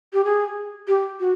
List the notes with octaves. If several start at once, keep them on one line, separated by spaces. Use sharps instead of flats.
G4
G#4
G4
F#4